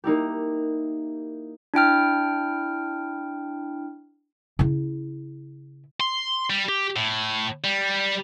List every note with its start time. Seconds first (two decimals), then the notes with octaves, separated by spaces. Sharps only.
0.04 A#3 D#4 E4 G4
1.74 D4 E4 G5 F6
4.59 C#3 E4
6.01 C6
6.50 G3
6.69 G4
6.96 A2
7.64 G3